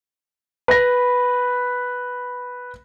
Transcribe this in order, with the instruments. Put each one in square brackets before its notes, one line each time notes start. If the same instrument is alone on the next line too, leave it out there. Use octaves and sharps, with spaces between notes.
[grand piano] B4 B5 A#6